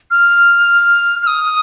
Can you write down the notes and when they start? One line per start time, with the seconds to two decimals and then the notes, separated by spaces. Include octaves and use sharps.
0.11 F6
1.23 F6
1.27 D#6